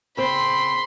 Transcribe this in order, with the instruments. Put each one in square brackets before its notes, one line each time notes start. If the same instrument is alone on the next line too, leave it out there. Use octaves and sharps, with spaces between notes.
[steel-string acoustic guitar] C#3 C4 [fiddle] B5 C6